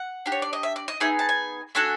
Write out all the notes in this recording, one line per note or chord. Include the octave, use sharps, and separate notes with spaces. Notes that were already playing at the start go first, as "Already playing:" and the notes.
Already playing: F#5
D4 G4
C#5
D5
D#5
E5
D5
D#5
B3 D#4 G#4 E5
A5
G#5
A3 D4 F#4 A4 G#5